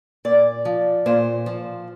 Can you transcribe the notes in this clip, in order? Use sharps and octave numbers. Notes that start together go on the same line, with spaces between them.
A#2 D5
F3
A#2 C5
F3